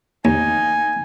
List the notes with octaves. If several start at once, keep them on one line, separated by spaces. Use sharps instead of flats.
D#2 A#3 D#4 G#5